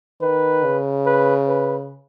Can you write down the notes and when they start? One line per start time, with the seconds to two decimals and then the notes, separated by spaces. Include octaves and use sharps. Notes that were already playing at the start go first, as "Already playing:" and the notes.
0.21 D#3 B4
0.64 C#3
1.06 B4
1.48 B4